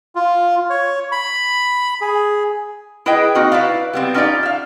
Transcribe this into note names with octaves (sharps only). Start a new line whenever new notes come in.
F4
C#5
B5
G#4
E4 G#4 B4 D#5 G5
A#3 C4 D#4 F#4
E4 B4 D5 F5
G3 B3 C4
C#4 D#4 F4 G4 D5
E5 F5